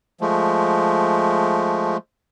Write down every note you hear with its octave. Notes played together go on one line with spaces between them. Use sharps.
F3 G#3 A3